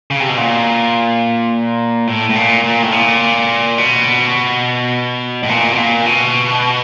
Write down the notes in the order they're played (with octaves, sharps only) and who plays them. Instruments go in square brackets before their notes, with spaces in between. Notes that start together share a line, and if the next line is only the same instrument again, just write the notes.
[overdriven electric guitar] C#3
C3
B2
A#2
A2
A2
A#2
A#2
A2
A#2
B2
A2
A#2
B2
A#2
B2